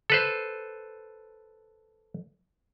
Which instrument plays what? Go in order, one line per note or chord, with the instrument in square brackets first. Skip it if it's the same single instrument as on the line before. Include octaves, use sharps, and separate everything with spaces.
[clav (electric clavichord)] A4 B4 C5